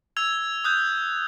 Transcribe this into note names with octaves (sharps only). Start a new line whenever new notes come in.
E6 G#6 F7
D#6 F#6 G6